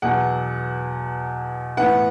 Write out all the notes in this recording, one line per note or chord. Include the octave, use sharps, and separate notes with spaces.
E2 B2 F#3 F#5
A2 E3 B3 F#5